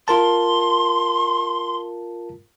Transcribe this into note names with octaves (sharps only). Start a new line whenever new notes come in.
F4 A#4 A5 C6